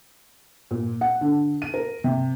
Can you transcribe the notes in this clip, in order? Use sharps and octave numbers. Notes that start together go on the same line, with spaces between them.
A#2
F#5
D3
D#7
A#4
C3